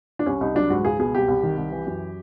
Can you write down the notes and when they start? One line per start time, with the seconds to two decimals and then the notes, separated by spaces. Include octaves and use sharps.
0.19 D4
0.26 C2 C#4
0.41 C2 D#4
0.55 F#3 D4
0.70 G#2 F#4
0.85 C#2 G#4
0.99 B2 G#4
1.15 C2 G4
1.28 C2
1.43 D#3
1.57 C2
1.72 E3
1.87 F#2